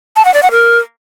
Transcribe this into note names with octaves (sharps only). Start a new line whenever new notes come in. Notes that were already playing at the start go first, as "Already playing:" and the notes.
A5
F#5
D5
F#5
A#4